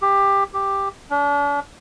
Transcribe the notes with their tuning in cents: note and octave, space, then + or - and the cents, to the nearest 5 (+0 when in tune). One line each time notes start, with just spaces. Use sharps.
G4 +15
G4 +5
D4 -40